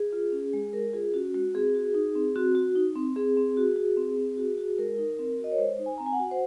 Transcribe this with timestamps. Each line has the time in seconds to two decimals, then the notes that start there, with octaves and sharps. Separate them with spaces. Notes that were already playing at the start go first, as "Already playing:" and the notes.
Already playing: G#4
0.12 F4
0.32 C#4
0.53 G#3
0.73 G#3 A#4
0.93 F4 G#4
1.14 C#4 F#4
1.34 G#3 F#4
1.54 C4 G#4
1.75 F#4
1.94 D#4
2.15 C4
2.36 C4 F#4
2.55 F#4
2.75 D#4
2.95 C4
3.16 C4 G#4
3.37 C4
3.57 F#4
3.76 F#4
3.97 C4
4.17 C4
4.37 F#4
4.58 F#4
4.78 G#3 A#4
4.98 D#4
5.19 C4
5.39 F#4
5.44 D#5
5.52 C#5
5.59 G#3 C5
5.79 D#4
5.86 G#5
5.98 C4 A#5
6.06 G#5
6.13 F#5
6.19 F#4
6.31 C5